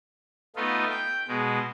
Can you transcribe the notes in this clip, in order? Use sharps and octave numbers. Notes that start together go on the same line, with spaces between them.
A3 B3 D#4 F4
G5
B2 G#3